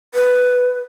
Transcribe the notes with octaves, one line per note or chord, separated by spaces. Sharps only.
B4